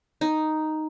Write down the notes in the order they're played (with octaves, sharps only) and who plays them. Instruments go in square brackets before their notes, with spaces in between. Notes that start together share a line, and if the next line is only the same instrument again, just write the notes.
[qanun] D#4